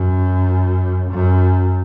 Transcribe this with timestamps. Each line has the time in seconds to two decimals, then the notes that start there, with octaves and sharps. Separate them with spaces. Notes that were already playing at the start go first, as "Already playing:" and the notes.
Already playing: F#2
1.11 F#2